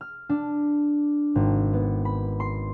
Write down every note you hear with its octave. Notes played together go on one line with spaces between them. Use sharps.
F6
D4
G#1
B3
B5
C6